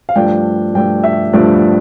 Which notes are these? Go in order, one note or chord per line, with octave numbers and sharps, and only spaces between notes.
F5
G2 F3 A3 D4 G5
G2 F3 A3 D4 G5
E5
G2 F3 A3 D4 D5